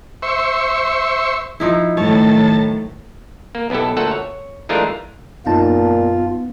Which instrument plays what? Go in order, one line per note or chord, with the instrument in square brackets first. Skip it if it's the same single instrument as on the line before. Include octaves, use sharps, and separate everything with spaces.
[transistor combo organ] C5 E5 C#6
[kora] F3 D#4 E4
[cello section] A2 D#3 F#3 [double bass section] A3 [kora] C#5 [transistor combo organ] A5
[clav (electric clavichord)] A#3
B1 B3 E4 G4 A4
D2 A#2 A3 A4 F#5
C#5
E3 G#3 A3 D4 F4 A#4
[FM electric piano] F#2 D#4 A5 [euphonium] A#2 [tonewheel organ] B3 [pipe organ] F4